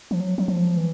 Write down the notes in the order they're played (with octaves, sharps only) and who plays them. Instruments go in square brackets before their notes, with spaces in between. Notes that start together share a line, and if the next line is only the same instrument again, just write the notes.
[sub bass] F3
F#3
F#3
F3
E3